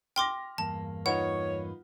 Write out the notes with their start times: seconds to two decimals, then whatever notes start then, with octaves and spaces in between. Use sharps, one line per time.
0.16 G5 C6 D6 F6 A#6
0.58 E2 G2 A#3 A5
1.06 D#4 F4 B4 C#5 F#5